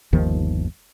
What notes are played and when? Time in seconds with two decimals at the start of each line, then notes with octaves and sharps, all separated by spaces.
0.13 G1 D#2 D#3 F3